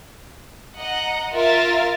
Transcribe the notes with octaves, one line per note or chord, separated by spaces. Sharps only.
D#5 F#5 A#5
F4 A#4 E5 F6 A6